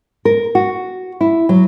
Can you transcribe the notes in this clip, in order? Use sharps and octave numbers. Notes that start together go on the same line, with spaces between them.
A#4
F#4
E4
F#3